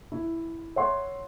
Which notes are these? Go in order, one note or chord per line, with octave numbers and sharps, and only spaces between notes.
E4
C#5 E5 F#5 C6